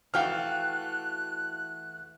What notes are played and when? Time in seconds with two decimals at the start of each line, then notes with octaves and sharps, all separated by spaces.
0.14 E3 A3 F#4 F5 G5 F6 F#6